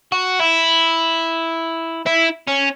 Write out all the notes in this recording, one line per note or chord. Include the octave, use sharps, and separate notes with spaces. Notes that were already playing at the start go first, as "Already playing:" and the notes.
F#4
E4
E4
C#4